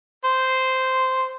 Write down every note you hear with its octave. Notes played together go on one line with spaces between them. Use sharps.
C5